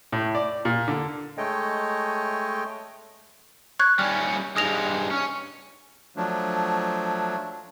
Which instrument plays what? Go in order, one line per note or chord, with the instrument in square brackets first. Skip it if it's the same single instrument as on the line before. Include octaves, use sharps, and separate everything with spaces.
[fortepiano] A2
D5
A#2
D3
[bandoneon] G#3 A3 C#5 D#5 G5
[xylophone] C#6 F#6 G#6
[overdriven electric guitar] G3 C#4 [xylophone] F6
[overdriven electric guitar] G2 G#3 [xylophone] D#6 A#6 F7
[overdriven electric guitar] C#4
[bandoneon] F3 F#3 A3 D4